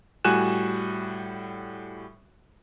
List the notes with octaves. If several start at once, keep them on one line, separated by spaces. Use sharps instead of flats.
A2 G3 F#4 G#5 F#6 E7